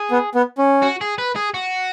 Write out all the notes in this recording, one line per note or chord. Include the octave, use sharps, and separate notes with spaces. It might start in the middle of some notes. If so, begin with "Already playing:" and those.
Already playing: G#4
B3
B3
C#4
F#4
G#4
B4
G#4
F#4